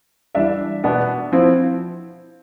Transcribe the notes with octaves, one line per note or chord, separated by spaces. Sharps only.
E3 G3 D4 E5
B2 B3 D4
F3 C4 E4